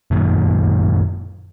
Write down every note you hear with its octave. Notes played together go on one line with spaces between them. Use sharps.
F#2 A#2 D#3